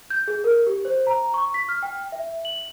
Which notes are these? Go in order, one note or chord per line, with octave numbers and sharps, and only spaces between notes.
G6
G#4
A#4
G4
C5
A#5
C#6
B6
F6
G5
E5
F#7